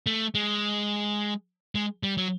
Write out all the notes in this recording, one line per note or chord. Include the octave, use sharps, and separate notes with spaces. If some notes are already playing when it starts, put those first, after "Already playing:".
A3
G#3
G#3
G3
F#3